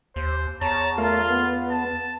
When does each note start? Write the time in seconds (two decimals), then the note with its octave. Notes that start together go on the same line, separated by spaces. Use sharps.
0.16 D#2 C5
0.61 E2 C#5 A5 A#5
0.98 A3 F4 A#4 F5
1.30 B3
1.71 A5